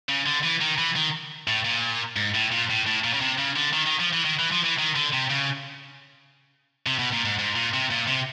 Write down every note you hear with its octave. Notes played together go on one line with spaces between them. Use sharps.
C#3
D3
E3
D#3
E3
D#3
A2
A#2
G#2
A2
A#2
A2
A2
A#2
C#3
C3
C#3
D3
D#3
D#3
F3
E3
D#3
E3
F3
E3
D#3
D3
C3
C#3
C3
B2
A#2
G#2
G#2
A#2
C3
A#2
C3